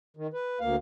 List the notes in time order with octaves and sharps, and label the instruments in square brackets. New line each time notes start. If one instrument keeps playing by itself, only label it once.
[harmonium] D#3
B4
D2 A#3 F5